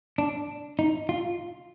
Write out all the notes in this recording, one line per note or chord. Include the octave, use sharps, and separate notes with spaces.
D4
D#4
F4